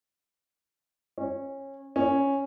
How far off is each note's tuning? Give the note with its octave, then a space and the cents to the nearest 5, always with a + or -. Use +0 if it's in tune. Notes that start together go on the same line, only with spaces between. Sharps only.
C#4 -20
C#4 -5